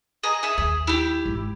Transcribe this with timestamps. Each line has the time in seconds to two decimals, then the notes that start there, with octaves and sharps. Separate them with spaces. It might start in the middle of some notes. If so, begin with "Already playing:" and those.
0.23 G#4 D#5 A#5
0.43 G#4 E5
0.58 D#2 G#4
0.87 E4 G4
1.26 G#1